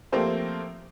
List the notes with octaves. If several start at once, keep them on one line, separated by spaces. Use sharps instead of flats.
F3 A3 A#3 C4 G4 C5